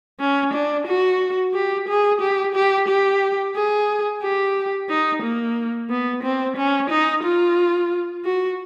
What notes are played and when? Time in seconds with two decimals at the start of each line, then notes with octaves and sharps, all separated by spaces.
0.20 C#4
0.53 D4
0.87 F#4
1.54 G4
1.88 G#4
2.21 G4
2.55 G4
2.88 G4
3.56 G#4
4.22 G4
4.89 D#4
5.23 A#3
5.90 B3
6.23 C4
6.56 C#4
6.90 D#4
7.23 F4
8.25 F#4